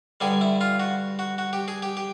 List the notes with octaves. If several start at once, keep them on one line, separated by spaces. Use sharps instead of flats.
G2 D3 G3 G#4
E4
F4
F#4
F#4
F#4
G4
G#4
G4
G4